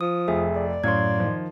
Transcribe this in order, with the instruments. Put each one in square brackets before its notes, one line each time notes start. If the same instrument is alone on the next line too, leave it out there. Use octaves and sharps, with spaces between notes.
[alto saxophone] F3 [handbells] D#6
[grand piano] F1 [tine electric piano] G#4 [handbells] E5
[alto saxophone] D5
[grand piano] F#2 C#5 [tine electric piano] A2 F5 [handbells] C6 G#6
[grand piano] D#3 F3